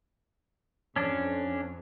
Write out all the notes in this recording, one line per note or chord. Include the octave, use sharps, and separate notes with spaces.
F2 C#4 D4